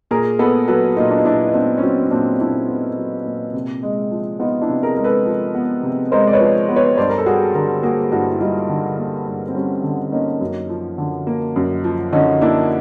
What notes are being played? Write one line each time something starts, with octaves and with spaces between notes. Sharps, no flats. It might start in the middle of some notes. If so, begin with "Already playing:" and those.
A#2 G#4 A#4
B3 A4 B4
F#3 A4 B4
A#2 D#4 F4
D4
D#4
A#2 D4 E4
D#4
B3 C4 D4
C#4
F#3 C4
C#4
A#2 C4 D4
A#2 D4 E4
B3
F#3
A#2
C3
G#3
F3
B3 D#4 F4
D4 E4
C3
G#4 A#4
G#3 A#4
A4 B4
F3
B3
C3
G#3 A#4 C5
D5
B4 C#5
F3
B3
B4 C#5
G2 C5 D5
A#4
A4
G3 F#4 G#4
D3 G#4 A#4
A#3 F#4 G#4
G2 E4 F#4
E4
G3 D#4 F4
D3
A#3
G2
C4
G3 C#4
D3
A#3 C#4 D#4
F#2
F3
D3
A#3
F#2
F3
D3 C#4 D#4
A#3 D4 E4